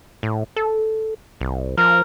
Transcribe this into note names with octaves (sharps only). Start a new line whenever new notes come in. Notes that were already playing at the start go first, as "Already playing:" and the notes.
A2
A4
C2
F3 A#4